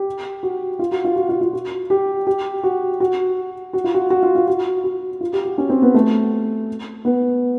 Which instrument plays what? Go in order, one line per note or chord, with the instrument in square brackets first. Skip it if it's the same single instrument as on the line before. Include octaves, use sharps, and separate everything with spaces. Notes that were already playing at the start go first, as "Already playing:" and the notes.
Already playing: [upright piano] G4
F#4
F4
F#4
F4
F#4
F4
F4
F#4
G4
G4
F#4
F#4
F#4
F4
F#4
F#4
F4
F4
F#4
F#4
F4
G4
F#4
C#4
C4
B3
A3
B3